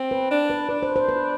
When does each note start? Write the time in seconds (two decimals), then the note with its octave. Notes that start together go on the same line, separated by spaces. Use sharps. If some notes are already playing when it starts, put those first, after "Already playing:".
Already playing: C4
0.11 B4
0.31 D4
0.50 B4
0.69 D4 B4
0.83 C5
0.96 C5
1.08 B4